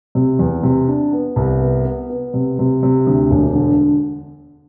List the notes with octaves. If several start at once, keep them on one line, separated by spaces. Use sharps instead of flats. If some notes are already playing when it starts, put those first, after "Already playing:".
C3
E2
C3
D4
B3
C2
B3
B3
B3
C3
C3
C3
D2
E1
D3